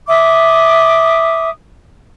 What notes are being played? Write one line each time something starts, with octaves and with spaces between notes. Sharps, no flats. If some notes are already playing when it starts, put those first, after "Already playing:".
E5 D6 D#6